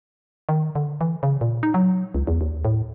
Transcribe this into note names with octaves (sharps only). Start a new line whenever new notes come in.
D#3
D3
E3
C#3
A#2
D#4
F#3
C#2
E2
D#2
A2